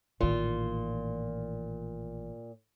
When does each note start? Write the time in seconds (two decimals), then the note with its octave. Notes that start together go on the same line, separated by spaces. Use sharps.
0.21 A1 A#2 D#3 F4